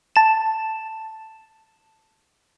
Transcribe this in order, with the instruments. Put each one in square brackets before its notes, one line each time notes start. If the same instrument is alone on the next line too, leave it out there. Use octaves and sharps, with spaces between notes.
[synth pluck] A5 E7